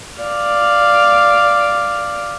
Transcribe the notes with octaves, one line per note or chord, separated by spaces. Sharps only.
D5 F5